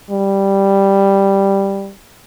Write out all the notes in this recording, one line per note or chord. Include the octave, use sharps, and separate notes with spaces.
G3